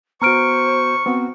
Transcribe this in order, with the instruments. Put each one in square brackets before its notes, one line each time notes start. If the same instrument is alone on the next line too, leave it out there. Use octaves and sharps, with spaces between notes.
[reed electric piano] B3 F#4 [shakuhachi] C5 [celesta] A#5 F6 D7 [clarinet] C#6
[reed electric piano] B3 C4 [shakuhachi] F#4